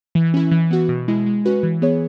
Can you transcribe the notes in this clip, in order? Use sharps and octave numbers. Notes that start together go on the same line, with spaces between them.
E3
C#4 E4
E3
B3 F#4
B2
G#3 E4
G#3
C#4 F#4 B4
E3
B3 G#4 C#5